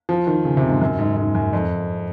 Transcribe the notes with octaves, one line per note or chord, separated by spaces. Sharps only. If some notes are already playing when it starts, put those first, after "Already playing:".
F3
D#3
C#3
C3
G#2
F#2
G#2
G#2
F#2
F2